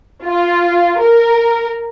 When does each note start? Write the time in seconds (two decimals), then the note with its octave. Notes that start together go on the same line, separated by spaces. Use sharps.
0.25 F4
0.99 A#4